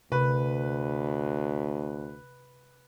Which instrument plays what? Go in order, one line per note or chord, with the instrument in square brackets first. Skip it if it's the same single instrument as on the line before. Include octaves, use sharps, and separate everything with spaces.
[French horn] D2 [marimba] C3 [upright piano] B4